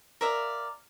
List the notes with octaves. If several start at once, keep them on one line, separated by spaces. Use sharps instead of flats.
A#4 D5 E5 F5